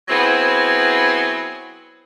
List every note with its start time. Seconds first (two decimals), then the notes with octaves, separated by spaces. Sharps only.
0.08 F#3 B3 C4 E4 G#4